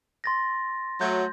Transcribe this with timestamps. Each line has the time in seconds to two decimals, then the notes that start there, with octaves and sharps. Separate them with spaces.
0.24 C6 A6 A#6
1.01 F#3 A3 G6